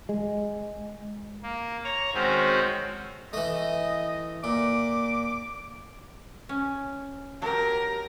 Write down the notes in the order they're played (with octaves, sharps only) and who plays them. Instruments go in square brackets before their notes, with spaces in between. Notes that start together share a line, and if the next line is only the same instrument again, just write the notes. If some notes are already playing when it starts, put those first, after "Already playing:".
[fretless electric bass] G#3
[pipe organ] A#3
C#5 A#5
D#3 G#3 C4 C#4 F#4
[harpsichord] E3 A3 [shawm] D#5
[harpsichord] A#2 [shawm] D6
[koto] C#4
[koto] F#3 G4 [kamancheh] A#4